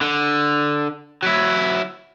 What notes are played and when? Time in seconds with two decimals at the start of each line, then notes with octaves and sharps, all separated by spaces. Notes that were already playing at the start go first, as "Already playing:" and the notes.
0.01 D3
1.23 F#3 E4